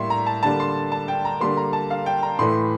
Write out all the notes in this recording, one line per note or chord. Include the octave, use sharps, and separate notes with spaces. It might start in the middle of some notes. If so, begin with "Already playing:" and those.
Already playing: A2 G3 A#3 E5 C6
A#5
A5
D3 G3 A#3 A5
C6
A5
G5
A#5
D3 G3 A#3 C6
A#5
A5
F5
G5
A#5
A2 E3 A3 C6